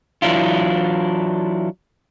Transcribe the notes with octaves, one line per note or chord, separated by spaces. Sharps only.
E3 F#3 D4 E4 F4